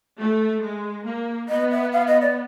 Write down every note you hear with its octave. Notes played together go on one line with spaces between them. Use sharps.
A3
G#3
A#3
B3 D#5
E5
F5
D#5
D5